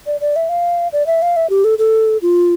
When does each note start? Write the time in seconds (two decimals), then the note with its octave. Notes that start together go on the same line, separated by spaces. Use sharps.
0.07 D5
0.21 D5
0.36 E5
0.49 F5
0.93 D5
1.07 E5
1.22 F5
1.36 E5
1.50 G4
1.64 A4
1.79 A4
2.22 F4